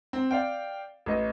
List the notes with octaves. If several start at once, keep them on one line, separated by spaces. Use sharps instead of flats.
C4
D5 F5 G5
A1 D#5